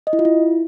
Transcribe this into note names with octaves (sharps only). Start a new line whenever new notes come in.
D#5
E4
F4
E4